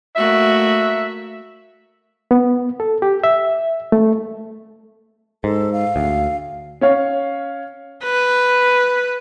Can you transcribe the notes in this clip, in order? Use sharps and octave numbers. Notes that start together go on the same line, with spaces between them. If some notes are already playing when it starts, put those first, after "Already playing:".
A3 A#3 F#4 E5
B3
A4
G4
E5
A3
G#2 A4
F5
D2
C#4 C#5 F5
B4